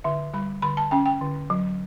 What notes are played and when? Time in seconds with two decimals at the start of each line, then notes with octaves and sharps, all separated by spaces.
0.04 D3 E5
0.34 G3 B5
0.62 D3 B5
0.77 A5
0.91 C#4 G5
1.06 G5
1.21 D3
1.50 F#3